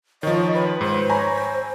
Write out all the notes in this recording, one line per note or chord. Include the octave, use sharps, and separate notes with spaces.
D#3 F3 C#5 D#5
B4 C#5
G#2 C5
C#5 G#5 A#5 B5